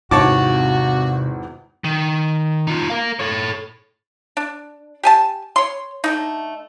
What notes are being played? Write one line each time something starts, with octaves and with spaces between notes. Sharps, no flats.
G#1 E2 C3 D#3 F#4 C#5 A5 D6
D#3
D#4 F4
A#4 F5
A4 C#5
D4
G4 G#5 A5
C#5 C6
D3 A3 D#4